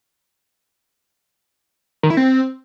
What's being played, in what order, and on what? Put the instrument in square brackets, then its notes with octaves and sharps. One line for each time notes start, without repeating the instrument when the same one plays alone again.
[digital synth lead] D#3
E4
C4